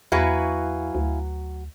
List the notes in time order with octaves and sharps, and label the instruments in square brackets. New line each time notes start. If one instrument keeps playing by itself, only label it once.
[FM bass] E2 [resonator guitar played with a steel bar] F#3 F#4 B4 [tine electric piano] E4 F5 G#5
[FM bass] D2